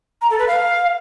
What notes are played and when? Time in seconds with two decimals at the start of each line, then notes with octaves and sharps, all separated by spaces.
0.21 A#5
0.30 A4
0.39 B4
0.48 F5